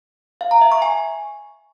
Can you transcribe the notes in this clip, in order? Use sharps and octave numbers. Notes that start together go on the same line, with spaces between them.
F5
A#5
E5
C#6
G#5